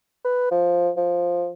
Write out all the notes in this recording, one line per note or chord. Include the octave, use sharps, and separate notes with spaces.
B4
F3
F3